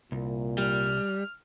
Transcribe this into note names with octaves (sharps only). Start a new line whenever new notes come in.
C2 A#2
G3 F6